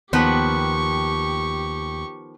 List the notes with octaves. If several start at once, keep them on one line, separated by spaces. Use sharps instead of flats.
D#2 D#3 F3 B3 G4 C#6